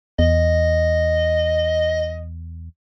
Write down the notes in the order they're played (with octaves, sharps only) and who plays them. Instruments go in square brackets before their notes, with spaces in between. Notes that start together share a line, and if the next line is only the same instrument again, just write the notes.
[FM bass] E2 [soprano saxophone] D#5